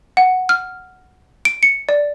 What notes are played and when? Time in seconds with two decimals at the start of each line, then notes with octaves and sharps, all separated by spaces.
0.17 F#5
0.49 F6
1.45 D7
1.63 C#7
1.89 D5